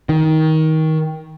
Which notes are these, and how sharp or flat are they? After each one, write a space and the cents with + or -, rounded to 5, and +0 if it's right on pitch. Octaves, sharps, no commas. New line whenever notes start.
D#3 +20